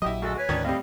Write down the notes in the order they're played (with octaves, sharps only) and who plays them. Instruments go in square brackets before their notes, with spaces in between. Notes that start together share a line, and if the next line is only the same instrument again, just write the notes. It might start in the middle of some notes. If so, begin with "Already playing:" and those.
[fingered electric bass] A#1 F#3 [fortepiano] E4 G4 D#5
[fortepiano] D2 [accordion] G#3 F#4 [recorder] A4
[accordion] B4 G#5 [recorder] C#5
[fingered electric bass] D2 G#2 [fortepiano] D#3 C#4 D4
[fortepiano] A2 G3 [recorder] C4 [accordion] D#5 F5